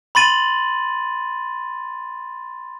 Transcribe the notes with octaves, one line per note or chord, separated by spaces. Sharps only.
B5 C6 A6 D#7 F#7